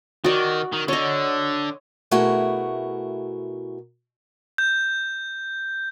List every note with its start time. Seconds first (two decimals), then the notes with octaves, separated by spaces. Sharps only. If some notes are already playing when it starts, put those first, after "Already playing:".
0.24 D#3 F#4 D5
0.72 D#3
0.88 D3 C#5 D#5
2.11 B2 A3 E4 F#4 G#4 A#4
4.58 G6